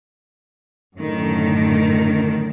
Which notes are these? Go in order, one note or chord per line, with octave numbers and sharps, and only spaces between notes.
F#2 A2 D3 D#3